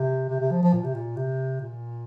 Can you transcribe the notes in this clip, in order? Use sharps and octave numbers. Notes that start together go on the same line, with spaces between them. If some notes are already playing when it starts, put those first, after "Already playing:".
Already playing: C3
C3
C3
F3
F3
A#2
C3
A#2
C3
A#2